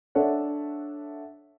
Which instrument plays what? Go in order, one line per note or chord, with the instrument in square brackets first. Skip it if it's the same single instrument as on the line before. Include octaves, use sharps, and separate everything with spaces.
[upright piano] D4 A4 C#5 E5 F#5